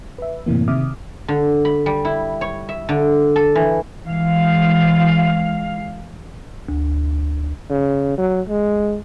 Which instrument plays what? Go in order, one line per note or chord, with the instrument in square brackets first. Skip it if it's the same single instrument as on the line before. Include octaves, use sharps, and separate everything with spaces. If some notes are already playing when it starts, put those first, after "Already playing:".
[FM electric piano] B4 E5
F#2 A2 C3 E3 A#3
C3 D#3 E5 D6 D#6 F6
[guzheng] D3
B5
G3
E4
C#5
E5
D3
A4
E3
[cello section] E3 G#3 F5
[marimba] D2
[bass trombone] C#3
F#3
G#3